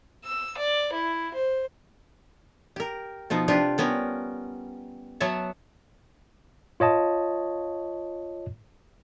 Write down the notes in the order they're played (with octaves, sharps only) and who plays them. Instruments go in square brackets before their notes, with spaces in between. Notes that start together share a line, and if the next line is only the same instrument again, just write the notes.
[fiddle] E6
D5
E4
C5
[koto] G4 A#4
B2 F3 B3 D#4
C3 D4 F4 G4 B4
G3 B3 C#4 A#4
F#3 B3 F#4 C#5 E5 A5
[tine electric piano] F4 C#5 D#5 A5